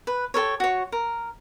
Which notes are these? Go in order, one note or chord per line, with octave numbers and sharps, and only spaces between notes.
B4
G4 A4 A#4 C#5
F#4 C#5
A#4